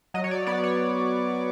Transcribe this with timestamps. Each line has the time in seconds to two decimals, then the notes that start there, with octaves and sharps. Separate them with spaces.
0.14 F#3 D#5
0.24 C#5
0.31 D5
0.47 B3 D5
0.64 C#5